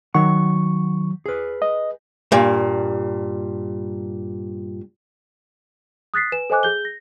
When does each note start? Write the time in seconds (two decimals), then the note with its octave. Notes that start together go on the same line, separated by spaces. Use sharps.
0.14 D#3 F#3 F#5 C#6
1.26 G#4 B4
1.62 D#5
2.32 G2 A#2
6.14 D#6 F#6 A6 B6 C7
6.32 B4 G#5 E7
6.50 A4 C5 D#5 G#5 D6 F#6
6.63 G#4 G6 G7
6.85 A#6